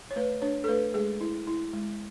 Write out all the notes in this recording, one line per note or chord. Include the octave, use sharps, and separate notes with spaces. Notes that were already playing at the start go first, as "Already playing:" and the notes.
C#5
A3 B4
D4 C#5
A4
A3 B4
G#3 G#4
E4
E4
G#3